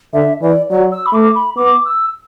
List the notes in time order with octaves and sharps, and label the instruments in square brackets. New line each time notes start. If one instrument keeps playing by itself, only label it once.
[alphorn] D3 [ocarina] E5
[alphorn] E3 [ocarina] D5
[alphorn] F#3 [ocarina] D5
[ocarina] E6
B5
[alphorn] A3 [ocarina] D6
[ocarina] B5
[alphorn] B3 [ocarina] D6
[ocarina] E6